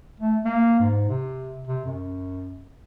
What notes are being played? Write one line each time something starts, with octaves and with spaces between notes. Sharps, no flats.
A3
A#3
G#2
C3
C3
F#2